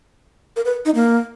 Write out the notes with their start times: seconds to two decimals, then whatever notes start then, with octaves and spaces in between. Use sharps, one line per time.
0.56 A#4
0.65 B4
0.85 D#4
0.95 A#3